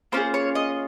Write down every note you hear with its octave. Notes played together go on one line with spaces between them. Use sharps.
A#3 C#4 F4 G#4 C5
C#5
D#5